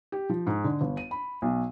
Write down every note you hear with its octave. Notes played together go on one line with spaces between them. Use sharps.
G4
F3
G#2
D3
G1
D#7
B5
B1